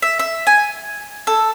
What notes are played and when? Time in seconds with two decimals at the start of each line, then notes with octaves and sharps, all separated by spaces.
0.02 E5
0.19 E5
0.47 G#5
1.27 A4